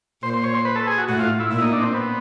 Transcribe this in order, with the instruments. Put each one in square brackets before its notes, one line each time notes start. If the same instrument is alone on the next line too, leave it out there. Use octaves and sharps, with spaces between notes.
[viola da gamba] A#2 [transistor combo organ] C5
[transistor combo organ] C5
C#5
C5
B4
A4
G#4
F#4
[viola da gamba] A2 [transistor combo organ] F#4
[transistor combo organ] F4
E4
[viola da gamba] A#2 [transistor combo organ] E4
[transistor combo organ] D#4
D4
C4
B3